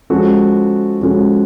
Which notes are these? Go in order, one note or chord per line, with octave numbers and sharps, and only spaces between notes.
F3 G#3 C#4 F#4 A4
F3 G#3 C#4 F#4 A4